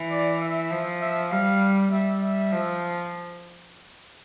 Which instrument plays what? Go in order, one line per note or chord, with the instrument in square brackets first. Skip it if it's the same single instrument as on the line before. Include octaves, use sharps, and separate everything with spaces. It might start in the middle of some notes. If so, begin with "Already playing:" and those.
Already playing: [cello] E3
[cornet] D5
E5
[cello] F3
[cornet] E5
[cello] G3 [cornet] F5
[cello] G3 [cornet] E5
[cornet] E5
[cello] F3